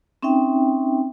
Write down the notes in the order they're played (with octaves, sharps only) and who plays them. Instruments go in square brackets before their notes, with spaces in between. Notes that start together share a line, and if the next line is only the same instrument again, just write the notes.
[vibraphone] C4 C#4 D#4 E5 G5